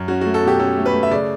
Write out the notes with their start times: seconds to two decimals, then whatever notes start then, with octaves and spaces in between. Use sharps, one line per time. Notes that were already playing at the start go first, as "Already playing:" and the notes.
Already playing: F#2
0.08 C#4 F#4
0.21 F#4
0.26 A3
0.34 A4
0.43 B2 G4
0.60 C#4 A4
0.77 A3
0.86 B4
0.94 A3
1.03 E5
1.11 C#3 D5